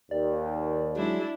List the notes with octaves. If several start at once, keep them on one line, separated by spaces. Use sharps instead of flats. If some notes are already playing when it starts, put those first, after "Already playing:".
D#2 D5
F#3 G#3 D4 E4